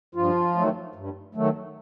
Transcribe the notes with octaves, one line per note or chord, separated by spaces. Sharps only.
G2 F3 F4
D#3 F#3 A3
G2
D#3 F#3 A3